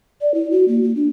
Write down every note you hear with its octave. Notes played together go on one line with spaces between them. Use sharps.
D5
E4
F#4
A#3
A#3
D4